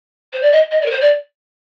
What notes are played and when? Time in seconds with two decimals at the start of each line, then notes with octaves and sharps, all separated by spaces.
0.33 C5
0.42 D5
0.52 D#5
0.71 D#5
0.81 D5
0.85 A#4
0.91 C5
1.01 D5